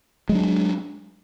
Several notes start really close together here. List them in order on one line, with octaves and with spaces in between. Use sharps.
G#3 F#3 D4